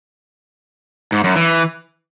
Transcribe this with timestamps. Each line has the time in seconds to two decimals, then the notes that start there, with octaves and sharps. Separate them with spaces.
1.12 G#2
1.24 F#2
1.36 E3